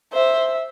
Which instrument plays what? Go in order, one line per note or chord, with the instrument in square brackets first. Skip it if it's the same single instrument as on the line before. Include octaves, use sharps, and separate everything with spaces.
[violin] C5 [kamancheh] E5